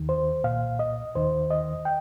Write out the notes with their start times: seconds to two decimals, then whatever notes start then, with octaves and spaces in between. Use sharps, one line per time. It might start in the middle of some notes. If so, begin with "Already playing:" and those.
Already playing: D#2 D#3
0.09 C5
0.44 C2 A#2 F5
0.79 D#5
1.15 D#2 D#3 C5
1.51 D#5
1.85 G5